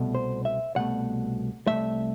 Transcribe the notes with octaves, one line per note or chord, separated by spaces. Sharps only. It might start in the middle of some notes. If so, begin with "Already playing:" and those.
Already playing: C2 B2 A3
C5
E5
C2 B2 A3 F#5
C2 B2 A3 E5